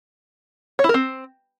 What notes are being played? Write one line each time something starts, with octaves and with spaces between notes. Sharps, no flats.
C#5
E4
A#4
C4